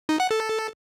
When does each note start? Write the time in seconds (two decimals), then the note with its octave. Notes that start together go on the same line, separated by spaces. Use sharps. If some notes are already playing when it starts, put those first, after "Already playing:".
0.09 D#4
0.20 F#5
0.31 A4